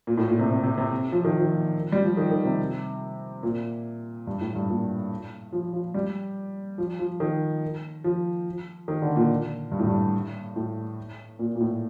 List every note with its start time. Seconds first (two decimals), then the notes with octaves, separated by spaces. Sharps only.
0.07 A#2
0.17 A2
0.28 A#2
0.39 C3
0.50 C3
0.63 C3
0.78 C3
1.12 F3
1.25 D#3
1.37 F3
1.92 G3
2.05 F3
2.17 D#3
2.31 D#3
2.45 C3
3.43 A#2
4.27 G2
4.41 A2
4.55 G2
4.69 A#2
5.52 F3
5.73 F3
5.94 G3
6.78 F3
6.99 F3
7.20 D#3
8.04 F3
8.88 D#3
9.02 D3
9.16 A#2
9.72 G2
9.79 A2
9.86 G2
10.56 A2
11.39 A#2
11.55 A#2
11.60 A2